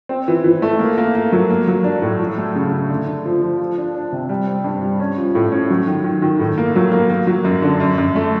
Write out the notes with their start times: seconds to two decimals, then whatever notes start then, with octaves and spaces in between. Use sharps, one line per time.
0.09 C4
0.28 E3
0.44 E3
0.62 A3
0.79 A#3
0.98 A#3
1.15 A#3
1.32 F#3
1.50 A#3
1.67 F#3
1.84 D4
2.02 A2
2.20 F#3
2.38 A3
2.55 C#3
2.72 C#3
2.89 D3
3.07 D3
3.25 F3
3.42 F3
3.59 F3
3.78 D4
3.95 D4
4.12 C3
4.29 G3
4.47 C4
4.64 G2
4.82 G3
5.00 C#4
5.17 F3
5.35 A2
5.52 C#4
5.70 F#3
5.87 D#3
6.04 D#3
6.22 D#3
6.39 A2
6.58 A#3
6.75 F#3
6.92 A#3
7.10 A#3
7.27 F#3
7.44 F#2
7.62 D3
7.80 F#2
7.98 F#2
8.15 A3